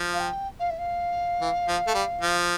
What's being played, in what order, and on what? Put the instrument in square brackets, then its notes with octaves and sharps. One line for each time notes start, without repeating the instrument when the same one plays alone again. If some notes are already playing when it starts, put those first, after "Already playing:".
Already playing: [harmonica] F3
[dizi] F5
G5
F5
E5
F5
[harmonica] E3
F3
A3
G3
F3